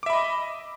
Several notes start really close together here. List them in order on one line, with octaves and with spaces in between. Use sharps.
D6 E5 B5 D#5